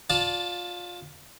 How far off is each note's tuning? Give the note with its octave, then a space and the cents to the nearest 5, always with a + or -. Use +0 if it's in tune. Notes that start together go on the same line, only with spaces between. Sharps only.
F4 +20 D5 -10 A5 +0